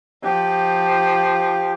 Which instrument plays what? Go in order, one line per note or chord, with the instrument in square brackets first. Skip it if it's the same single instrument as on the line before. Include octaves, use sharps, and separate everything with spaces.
[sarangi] F3 [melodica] G4